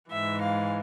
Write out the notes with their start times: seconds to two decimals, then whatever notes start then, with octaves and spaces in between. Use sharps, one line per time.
0.11 G#2 E3 E5
0.41 F5